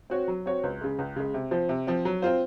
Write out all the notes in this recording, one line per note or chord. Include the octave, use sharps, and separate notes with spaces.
C4 F#4 C#5
F#3
C4 F#4 C#5
C#2
C#3 G#3
C#2
C#3 G#3
C3
F3 C4
C3
F3 C4
F#3
C4 F4 C5